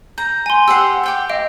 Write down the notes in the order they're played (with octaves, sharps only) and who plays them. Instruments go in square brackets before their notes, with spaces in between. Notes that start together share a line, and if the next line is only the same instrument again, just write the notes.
[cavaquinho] A#5 [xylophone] G6
[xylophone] G#5 C6
[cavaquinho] G4 C5 F#5 [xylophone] E6 C7
[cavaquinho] G4 G5 D6
[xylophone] D#5 F5 D7